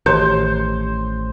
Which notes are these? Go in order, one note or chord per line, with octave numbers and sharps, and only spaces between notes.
A1 D#3 G4 C5 C#5